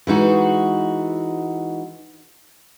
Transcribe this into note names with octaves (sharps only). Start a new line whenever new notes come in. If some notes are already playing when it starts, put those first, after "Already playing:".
E3 G#3 D#4 F#4